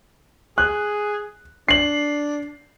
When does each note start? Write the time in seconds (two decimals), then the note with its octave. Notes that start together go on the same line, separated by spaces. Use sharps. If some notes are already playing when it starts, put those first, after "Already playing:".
0.58 G#4 F#6
1.69 D4 C7 F#7